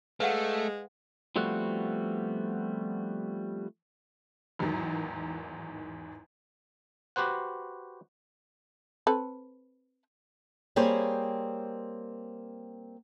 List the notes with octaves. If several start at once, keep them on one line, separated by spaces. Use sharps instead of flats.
G#3 A3 B4 F5 F#5
F3 G3 A3 B3 C4 F#4
A1 E2 G#2 D#3 F#3
F#4 G4 B4 C5 F#5
C4 A4 B4
G3 A#3 C4 G#4 C5 C#5